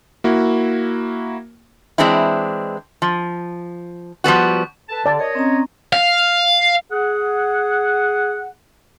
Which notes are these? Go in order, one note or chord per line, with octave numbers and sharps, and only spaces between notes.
A#3 E4 F#4
E3 G#3 C4 D4 E4
F3
F3 G3 B3 F#4
A4 B4 A5
D3 D5 A5
A#4 C#5 D#5
C4 C#4 A#5
F5
G#4 F#5